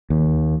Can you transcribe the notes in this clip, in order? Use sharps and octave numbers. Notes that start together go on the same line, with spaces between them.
D#2